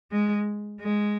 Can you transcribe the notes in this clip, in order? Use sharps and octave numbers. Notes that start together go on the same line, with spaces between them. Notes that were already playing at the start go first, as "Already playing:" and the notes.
G#3
G#3